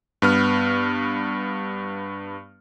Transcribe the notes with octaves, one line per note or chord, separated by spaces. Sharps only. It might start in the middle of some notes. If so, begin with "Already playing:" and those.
G2 B3 F6